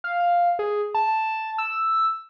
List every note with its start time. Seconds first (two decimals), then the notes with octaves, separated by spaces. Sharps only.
0.04 F5
0.20 F5
0.59 G#4
0.95 A5
1.58 E6